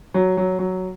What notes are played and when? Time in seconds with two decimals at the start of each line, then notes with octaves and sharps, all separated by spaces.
0.14 F#3
0.37 F#3
0.59 F#3